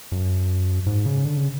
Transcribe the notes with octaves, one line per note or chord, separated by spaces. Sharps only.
F#2
G#2
C#3
D3
C#3